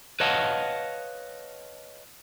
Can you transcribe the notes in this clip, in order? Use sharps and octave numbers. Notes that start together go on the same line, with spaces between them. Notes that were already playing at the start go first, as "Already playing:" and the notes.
B4 C#5 D#5 F5 F#5 A5